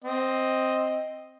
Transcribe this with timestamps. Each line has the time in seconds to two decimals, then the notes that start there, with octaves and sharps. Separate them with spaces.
0.04 C4 D#5